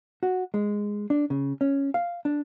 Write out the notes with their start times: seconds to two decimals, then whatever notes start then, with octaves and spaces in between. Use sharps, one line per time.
0.23 F#4
0.54 G#3
1.10 D4
1.30 C#3
1.61 C#4
1.94 F5
2.25 D4